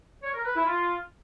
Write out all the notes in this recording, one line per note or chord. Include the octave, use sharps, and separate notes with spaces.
C#5
A#4
B4
E4
F4